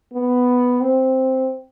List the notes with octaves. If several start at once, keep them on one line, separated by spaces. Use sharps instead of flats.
B3
C4